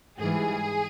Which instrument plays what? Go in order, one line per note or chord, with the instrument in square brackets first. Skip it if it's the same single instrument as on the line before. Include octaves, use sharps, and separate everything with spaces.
[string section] G#2 E3 G3 G#4